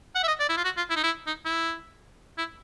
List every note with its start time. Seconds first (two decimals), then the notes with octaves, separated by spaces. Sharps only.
0.15 F#5
0.24 E5
0.28 D#5
0.40 D5
0.49 E4
0.57 F4
0.64 F#4
0.77 F4
0.90 E4
0.96 D#4
1.04 E4
1.27 D#4
1.45 E4
2.38 E4